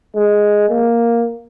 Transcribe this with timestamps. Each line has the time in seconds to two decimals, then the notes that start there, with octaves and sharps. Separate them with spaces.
0.15 G#3
0.69 A#3